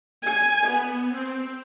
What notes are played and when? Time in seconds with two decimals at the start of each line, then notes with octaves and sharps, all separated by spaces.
0.24 G#5
0.67 B3
1.14 C4